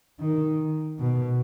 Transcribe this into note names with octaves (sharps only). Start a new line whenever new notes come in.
D#3
B2